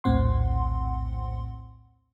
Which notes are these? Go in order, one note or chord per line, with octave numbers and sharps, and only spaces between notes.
A#1 D#2 A2 C4 F#5 C6